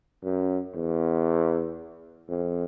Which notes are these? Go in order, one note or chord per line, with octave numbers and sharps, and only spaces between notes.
F#2
E2
F2